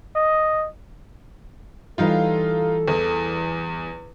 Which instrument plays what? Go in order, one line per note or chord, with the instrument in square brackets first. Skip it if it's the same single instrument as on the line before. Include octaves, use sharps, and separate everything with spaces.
[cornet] D#5
[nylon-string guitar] E3 G3 F5 [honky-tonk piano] D#4 F4 [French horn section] A4
[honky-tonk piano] E2